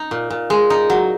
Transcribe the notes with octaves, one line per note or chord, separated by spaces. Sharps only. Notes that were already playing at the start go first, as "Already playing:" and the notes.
Already playing: D#4
A#2
A#2
G#3
D#4
F#3